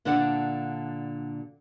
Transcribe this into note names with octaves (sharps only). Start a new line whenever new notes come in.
A#2 D3 D4 A4 D5 F#5